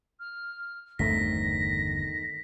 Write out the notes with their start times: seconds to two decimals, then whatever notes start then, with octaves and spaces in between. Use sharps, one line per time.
0.20 F6
0.99 G1 E2 D3 D#3 A3 C4 A#6 B6